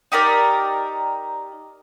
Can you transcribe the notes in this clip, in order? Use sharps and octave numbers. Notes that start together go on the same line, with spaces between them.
D#4 G4 A#4 D5